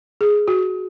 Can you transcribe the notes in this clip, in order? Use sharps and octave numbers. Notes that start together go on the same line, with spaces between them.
G#4
F#4